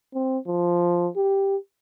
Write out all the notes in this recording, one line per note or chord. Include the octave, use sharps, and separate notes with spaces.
C4
F3
G4